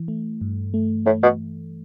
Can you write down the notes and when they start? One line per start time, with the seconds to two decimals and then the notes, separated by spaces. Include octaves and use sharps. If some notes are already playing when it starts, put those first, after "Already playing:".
Already playing: E3
0.08 A3
0.41 G2
0.74 A3
1.06 A2 A3
1.23 B2